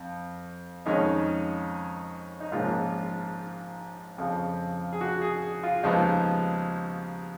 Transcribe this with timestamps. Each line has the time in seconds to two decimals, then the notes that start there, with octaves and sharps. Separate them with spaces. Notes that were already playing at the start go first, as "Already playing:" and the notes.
Already playing: F2
0.86 F2 D#3 G#3 C#4 D#4
2.40 D#4
2.51 A#1 G#2 F3 A#3 C#4 F4
4.18 F2 C#3 F3
4.93 G#4
5.01 F#4
5.22 G#4
5.63 F4
5.83 D#2 C#3 F3 G#3 B3 D#4